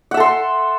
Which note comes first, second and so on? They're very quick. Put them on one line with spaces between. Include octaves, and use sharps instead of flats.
F#5 E5 A4 C6